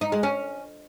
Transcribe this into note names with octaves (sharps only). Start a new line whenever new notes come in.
D#4
G#3
C#4